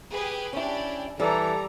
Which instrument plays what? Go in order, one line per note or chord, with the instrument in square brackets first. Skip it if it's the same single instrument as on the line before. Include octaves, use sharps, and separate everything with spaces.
[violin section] G4 G#4 B4
[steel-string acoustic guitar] C#4 E4 [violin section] D4 G4
[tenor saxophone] E3 [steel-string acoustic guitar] G3 [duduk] A4 [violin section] A#5